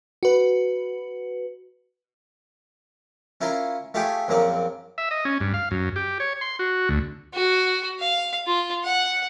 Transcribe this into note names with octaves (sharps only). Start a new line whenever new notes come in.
F#4 B4
C#4 E4 F4 A#4 A#5 C6
A3 F4 G4 G#4 C#5 G5
A#1 F#2 A#3 C4 A#5 D6
E5
D#5
C#4
G2
F5
F#2
G4
C#5
C6
F#4
D2
F#4
F5
F4
F#5